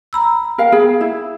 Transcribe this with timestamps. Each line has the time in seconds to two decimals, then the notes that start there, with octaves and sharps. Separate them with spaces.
0.13 A#5 B5 E6
0.58 A#4 F5 G5
0.72 B3 G#4
1.01 E4